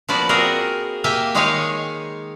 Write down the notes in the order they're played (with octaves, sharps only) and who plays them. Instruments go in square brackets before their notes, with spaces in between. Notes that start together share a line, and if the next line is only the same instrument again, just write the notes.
[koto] F3 A#3 B3 F#4 B4 D5
C4 F#4 G#4 A#4 D5
A#3 G4 E5 G5 G#5
D#3 G#3 D#4 C#5 F5 G#5